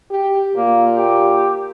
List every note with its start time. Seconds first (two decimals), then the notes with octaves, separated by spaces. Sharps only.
0.10 G4
0.56 A#2 A#3
0.96 G4